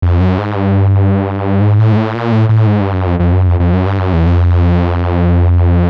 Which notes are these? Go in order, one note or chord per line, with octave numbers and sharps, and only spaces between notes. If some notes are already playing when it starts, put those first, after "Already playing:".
F2
F#2
G#2
G2
G#2
A2
G#2
A2
A#2
A2
A2
G#2
G2
F#2
F2
F2
F#2
F2
F2
F#2
G2
F#2
E2
F2